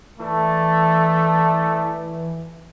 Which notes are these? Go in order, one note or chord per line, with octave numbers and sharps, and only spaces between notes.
E3 A3 D5 A5